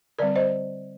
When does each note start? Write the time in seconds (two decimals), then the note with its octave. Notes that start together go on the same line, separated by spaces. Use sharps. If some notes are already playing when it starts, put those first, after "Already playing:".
0.19 D3 G3 C4 A#4 D5
0.36 C5 D#5